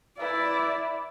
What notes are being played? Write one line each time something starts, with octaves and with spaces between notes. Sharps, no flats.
E4 B4 D5 E5